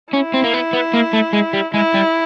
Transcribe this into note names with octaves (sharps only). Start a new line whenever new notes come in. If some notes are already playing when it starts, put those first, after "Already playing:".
C#4 E4
C4
A#3
B3
B3
A#3
A3
G#3
G3
G#3 E4
G3